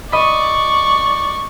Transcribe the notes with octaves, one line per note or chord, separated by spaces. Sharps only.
D5 D#5 B5 C#6